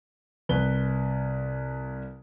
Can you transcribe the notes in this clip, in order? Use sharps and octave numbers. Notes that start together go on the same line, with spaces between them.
C2 B4 G7